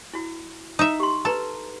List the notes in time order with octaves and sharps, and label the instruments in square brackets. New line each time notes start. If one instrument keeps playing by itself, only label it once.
[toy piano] E4 F#4
[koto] D#4 E5
[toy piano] G4 C6
[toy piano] D#4 B4 A#5 [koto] A4